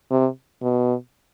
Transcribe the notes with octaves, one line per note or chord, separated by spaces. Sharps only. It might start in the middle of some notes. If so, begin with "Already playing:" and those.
C3
B2